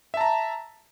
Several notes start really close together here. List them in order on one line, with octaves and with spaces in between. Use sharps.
E5 A5 A#5